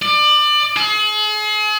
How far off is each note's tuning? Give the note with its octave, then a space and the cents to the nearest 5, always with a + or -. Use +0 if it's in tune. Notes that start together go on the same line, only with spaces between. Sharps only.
D5 +25
G#4 +40